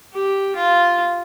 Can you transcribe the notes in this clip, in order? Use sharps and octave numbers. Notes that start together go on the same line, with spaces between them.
G4
F4